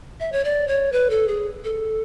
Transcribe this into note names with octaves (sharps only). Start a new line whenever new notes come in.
E5
C#5
D5
C#5
B4
A4
G#4
A4